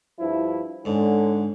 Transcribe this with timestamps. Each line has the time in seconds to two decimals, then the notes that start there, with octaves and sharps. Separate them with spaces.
0.20 G2 F3 E4
0.85 G#2 D3 C#4